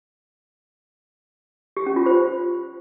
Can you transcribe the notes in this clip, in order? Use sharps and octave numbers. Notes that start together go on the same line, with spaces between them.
G4
C#4
F4
C5